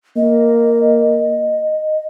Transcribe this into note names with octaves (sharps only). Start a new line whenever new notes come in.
A#3 D#5